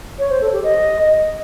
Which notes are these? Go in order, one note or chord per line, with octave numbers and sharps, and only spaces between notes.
C#5
C5
A4
G4
D#5